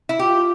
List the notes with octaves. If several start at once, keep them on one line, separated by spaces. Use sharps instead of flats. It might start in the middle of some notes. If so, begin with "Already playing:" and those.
E4
F4 G4